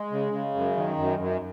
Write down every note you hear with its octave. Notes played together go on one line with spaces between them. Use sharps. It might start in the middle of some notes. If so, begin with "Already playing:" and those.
Already playing: G#3
C#3
C#3
F#2
D#3
F#2
F#2